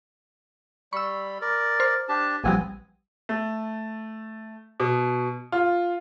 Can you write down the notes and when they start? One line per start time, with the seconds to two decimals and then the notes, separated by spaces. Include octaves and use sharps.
0.93 G3 B5 C#6 E6
1.42 A#4 D5
1.80 C5 F6
2.09 D4 G4 A5
2.44 A#1 F3 G3 B3 C4 G#5
3.29 A3
4.80 B2
5.52 F4